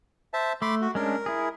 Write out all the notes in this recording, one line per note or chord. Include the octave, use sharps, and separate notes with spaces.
C5 E5 A5
A3 B5 C6 D6
F#4
G#3 C#4 D4 A#4
E4 G#4